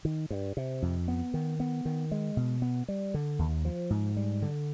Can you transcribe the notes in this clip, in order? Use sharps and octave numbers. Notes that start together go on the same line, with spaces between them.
D#3
G2
C3
F2
B3
D#3
B3
D#3
G#3
B2
B3
G3
D3
D#2
F3
G#2
G3
D3